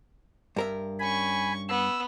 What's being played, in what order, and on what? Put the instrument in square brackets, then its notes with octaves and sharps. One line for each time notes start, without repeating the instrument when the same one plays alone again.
[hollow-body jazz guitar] G2 A#4 E5
[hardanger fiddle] C#4 C#6 [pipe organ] G#5 B5
[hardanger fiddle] B3 [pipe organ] E6